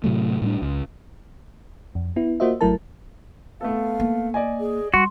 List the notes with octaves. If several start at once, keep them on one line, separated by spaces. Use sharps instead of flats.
A2 C3 F#3 A3
A2 G3 D4
C#2
F2
B3 E4
A#3 F4 F#4 C5 D#5 E5
G#1 F#3 A3 E4 A#4 A5
A3 B3 A4 F5
A#3
D5 D#5 G#5
G#4
G3 F#4 C6